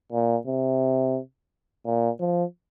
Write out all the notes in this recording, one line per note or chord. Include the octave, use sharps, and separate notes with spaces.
A#2
C3
A#2
F3